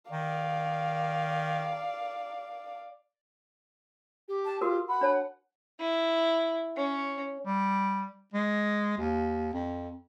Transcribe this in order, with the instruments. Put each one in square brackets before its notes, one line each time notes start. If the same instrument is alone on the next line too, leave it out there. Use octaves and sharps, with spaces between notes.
[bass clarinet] D#3 [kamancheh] D5 F5
[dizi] G4
[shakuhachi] A5
[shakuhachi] F4 [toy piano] F#4 A#4 B4
[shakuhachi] F#5 [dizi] B5
[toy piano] D4 C#5 A5
[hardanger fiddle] E4
C#4
[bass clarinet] G3
G#3
D#2
F2